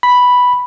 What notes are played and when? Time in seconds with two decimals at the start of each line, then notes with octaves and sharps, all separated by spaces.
0.03 B5